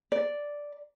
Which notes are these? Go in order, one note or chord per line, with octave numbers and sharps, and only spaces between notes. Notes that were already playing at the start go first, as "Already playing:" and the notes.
D5